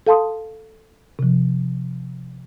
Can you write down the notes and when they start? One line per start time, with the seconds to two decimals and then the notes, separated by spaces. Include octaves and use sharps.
0.07 A4 F5 A5 C6 D#6
1.19 C3 F3